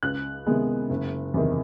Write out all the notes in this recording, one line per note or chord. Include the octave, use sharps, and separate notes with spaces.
C#2 F#6
C3 D#3 G#3 B3
F#1
E2 C3 D#3